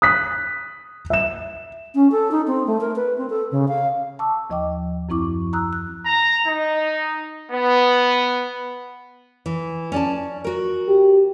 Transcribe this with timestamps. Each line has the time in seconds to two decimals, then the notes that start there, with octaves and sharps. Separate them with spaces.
0.02 D#6 F#6 B6
1.10 E5 E7
1.95 C#4
2.11 A4
2.31 D#4
2.47 C4
2.67 A3
2.80 A#4
2.96 B4
3.18 C4
3.29 A4
3.51 C#3
3.68 F5
4.19 A5 C#6 D6 E6
4.50 D#2 F3 D#5 G5 D6
5.09 F#2 F3 C4 E4 C#6 D6
5.53 A#5 D#6 E6 F#6
5.73 F#6
6.06 A#5
6.47 D#4
7.52 B3
9.46 E3
9.92 C#4 D5 A5
10.44 F#4 A#4
10.88 G4